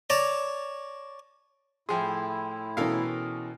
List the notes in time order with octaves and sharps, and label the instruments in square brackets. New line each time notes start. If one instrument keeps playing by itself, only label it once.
[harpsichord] C#5 D5 A5 A#5
[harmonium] A2 E4 [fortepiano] F3 G#4 [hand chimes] G5 C6
[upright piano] B2 E3 C#4 [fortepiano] A4 A#4 F5